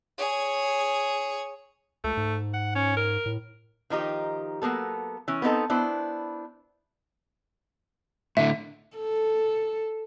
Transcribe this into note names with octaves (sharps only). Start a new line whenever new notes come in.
G#4 C#5
C#2 A3
G#2
F#5
C#4
A#4
A2
D#3 F3 D#4 G4
F#3 A#3 B3 A4
E3 C#4
B3 C4 D#4 A4
B3 D4 E4 C5
A2 D3 E5
A4